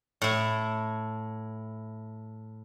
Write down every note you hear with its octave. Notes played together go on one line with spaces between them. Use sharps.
A2 E4